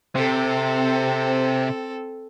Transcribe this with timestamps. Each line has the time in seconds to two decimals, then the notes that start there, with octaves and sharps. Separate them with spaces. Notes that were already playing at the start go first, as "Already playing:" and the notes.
0.15 C3 C4 A4